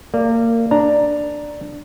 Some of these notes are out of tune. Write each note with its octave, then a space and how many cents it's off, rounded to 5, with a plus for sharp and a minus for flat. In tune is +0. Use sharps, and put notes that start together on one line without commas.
A#3 -25 D5 +0
D4 +5 A#5 +0